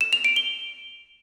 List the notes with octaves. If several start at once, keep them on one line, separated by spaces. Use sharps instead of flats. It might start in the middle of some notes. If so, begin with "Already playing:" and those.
E7
F7
D7
G7